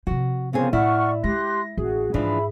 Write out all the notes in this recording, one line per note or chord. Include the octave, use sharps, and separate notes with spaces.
C3 F3 F#4
C#3 B3 C4 F4 G#4 A#4 C5
A2 E4 D5 F#5 C#6 F6
G#3 G4 C6 F#6 A#6
A1 F#4 G#4
G#2 E3 F3 D4 E5 B5